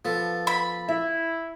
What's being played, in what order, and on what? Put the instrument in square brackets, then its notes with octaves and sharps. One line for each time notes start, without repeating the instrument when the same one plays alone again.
[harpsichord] F3 A4 [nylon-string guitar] B3
[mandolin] B5
[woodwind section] E4 [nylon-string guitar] E5